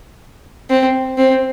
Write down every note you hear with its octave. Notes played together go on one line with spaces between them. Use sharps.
C4
C4